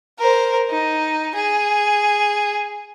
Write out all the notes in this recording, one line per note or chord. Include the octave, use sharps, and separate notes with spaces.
A#4 C5
D#4
G#4